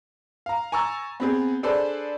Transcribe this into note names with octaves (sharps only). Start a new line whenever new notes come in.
F5 A#5
G#5 A#5 C#6 E6 A6
B3 C4 G#4
D4 G#4 A4 B4 C5 D5